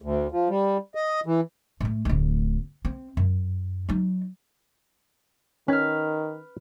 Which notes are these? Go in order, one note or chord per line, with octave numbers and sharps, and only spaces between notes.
D2
F3
G3
D#5
E3
A2 A3
D1 D2
C4
F#2
F#3 D#4
D#3 C#4 B4 G#5 F6